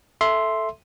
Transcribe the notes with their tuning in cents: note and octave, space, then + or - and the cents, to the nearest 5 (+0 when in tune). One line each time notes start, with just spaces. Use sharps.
A4 +0 E5 +0 C6 +0